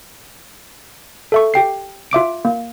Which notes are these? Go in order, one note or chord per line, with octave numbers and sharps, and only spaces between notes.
A4 E5 C#6
G4 G5 C7
F4 E5 D6 D7
A#3